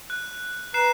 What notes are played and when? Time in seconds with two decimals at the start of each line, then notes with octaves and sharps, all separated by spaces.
0.10 F#6
0.74 B4 A#5 F#6 C7 E7